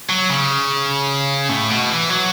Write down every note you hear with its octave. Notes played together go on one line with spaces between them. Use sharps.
F#3
C#3
A2
B2
E3
F#3